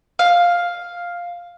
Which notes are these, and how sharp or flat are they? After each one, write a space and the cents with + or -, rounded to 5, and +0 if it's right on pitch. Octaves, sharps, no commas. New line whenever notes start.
F5 +5